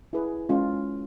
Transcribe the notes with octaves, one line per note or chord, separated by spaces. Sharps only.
E4 G#4 B4
G#3 C#4 F4